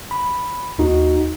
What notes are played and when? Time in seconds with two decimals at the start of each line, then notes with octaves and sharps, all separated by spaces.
0.11 B5
0.78 D#2 D#4 F#4